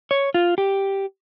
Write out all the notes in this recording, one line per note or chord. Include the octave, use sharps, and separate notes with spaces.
C#5
F4
G4